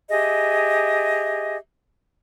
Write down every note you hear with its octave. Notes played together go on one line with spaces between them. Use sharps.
G4 G#4 D#5 E5